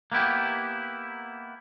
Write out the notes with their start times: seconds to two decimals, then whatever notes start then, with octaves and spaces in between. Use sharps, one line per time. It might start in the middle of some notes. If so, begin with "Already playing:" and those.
0.12 A#3 B3 E4 G4